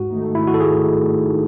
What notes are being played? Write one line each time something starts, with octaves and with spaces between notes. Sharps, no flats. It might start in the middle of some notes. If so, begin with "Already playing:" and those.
Already playing: G#2 F#4
D#3 A3 D#4
G#2 E4
F#4
A4
D#3 A3 D#4 G#4